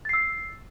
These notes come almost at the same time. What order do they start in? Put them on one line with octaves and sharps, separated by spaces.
A6 C7 E6